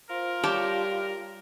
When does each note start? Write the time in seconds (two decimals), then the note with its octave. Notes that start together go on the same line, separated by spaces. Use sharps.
0.10 F4 A#4 C5
0.43 G3 G4 C#5 A5